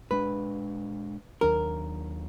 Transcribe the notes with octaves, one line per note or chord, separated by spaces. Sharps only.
A#2 G#3 D4 B4
D#2 D#3 F#3 D4 A#4